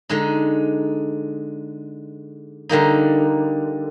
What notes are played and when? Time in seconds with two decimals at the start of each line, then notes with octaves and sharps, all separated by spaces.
0.09 D3 G#3 D#4
2.69 D3 G3 A#3 D#4